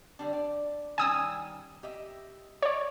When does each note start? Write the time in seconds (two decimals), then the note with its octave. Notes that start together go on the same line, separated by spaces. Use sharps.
0.19 D3 G3 D4
0.33 D5
0.98 D#3 G3 C#4 G#5 D#6 E6
1.83 G4 D#5 E5
2.62 C#5 D5